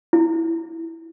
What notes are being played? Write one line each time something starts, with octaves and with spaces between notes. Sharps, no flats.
E4